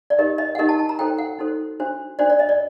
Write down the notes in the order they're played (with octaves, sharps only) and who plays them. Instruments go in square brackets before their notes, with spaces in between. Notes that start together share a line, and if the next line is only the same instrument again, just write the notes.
[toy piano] D5
D#4 G4 A#4 D#5
D#5
F#5
D#4 G4 A#4 D#5
A5
A5
A#5
D#4 F#4 A4 C5 G5
F#5
D#4 F#4 A4 C5
D4 F#4 C5
D4 F#4 C5 D5
D5
D#5
D5